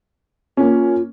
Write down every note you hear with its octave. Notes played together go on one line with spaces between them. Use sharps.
A#3 C#4 F4